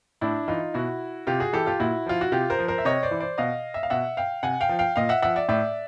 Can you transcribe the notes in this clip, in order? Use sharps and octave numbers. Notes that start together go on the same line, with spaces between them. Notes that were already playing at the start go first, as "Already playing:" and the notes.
A2 D4 E4
E3 D#4 F4
B2 E4 F#4
C3 F4 G4
F#4 G#4
E3 G4 A4
F4 G4
A#2 E4 F#4
F3 F4
F#4
C3 F4 G4
A#4 C5
F3
A#4 C5
E5
C3 C#5 D#5
C5 D5
E3
C5 D5
B2 D#5 F5
E5
F5
B2 E5 F#5
F5 G5
C3 F#5 G#5
F5 G5
F3
F5 G5
A#2 D#5 F5
E5 F#5
F3 E5 F#5
D5 E5
A2 D5 E5